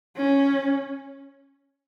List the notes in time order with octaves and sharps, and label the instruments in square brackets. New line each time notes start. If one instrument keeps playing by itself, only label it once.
[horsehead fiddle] C#4